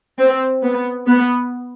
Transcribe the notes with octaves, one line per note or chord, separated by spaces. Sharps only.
C4
B3
B3